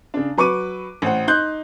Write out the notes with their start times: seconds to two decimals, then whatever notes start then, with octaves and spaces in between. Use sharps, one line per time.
0.14 C#3 D4
0.37 F#3 B4 C#6 D6 D#7
1.02 A1 C5 F#5
1.27 D#4 C6 F#6 G6